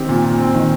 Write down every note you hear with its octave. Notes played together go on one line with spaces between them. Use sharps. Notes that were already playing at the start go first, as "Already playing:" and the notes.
Already playing: D#3 C4 G4
A#2
A#2
C4
D#3